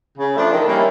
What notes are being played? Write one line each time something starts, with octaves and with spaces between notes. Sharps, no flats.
C#3
F3 A3 D4
D#3
G3 A#3 C#4 E4